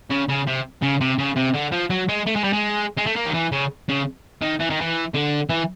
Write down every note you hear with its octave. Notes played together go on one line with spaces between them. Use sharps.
C#3
C#3
C3
C#3
C3
C#3
C3
D3
F3
F#3
G#3
A3
G#3
G3
G#3
G#3
A3
A#3
D#3
E3
C#3
C#3
D#3
E3
D#3
E3
D3
E3